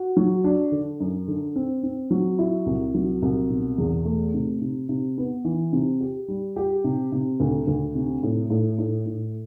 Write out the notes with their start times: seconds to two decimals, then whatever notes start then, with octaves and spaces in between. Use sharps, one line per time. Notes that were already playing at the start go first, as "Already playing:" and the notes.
Already playing: F#4
0.17 F#3
0.44 D4
0.72 D3
1.00 F#2
1.28 D3
1.56 C4
1.83 C4
2.11 F#3
2.39 E4
2.66 C2
2.94 F#3
3.22 C2
3.50 B2
3.78 E2
4.05 A3
4.34 C3
4.61 C3
4.89 C3
5.18 B3
5.45 E3
5.73 C3
6.00 G4
6.28 G3
6.56 G4
6.84 C3
7.12 C3
7.40 D2
7.67 D2
7.95 C3
8.23 A2
8.50 A2
8.78 A2
9.06 A2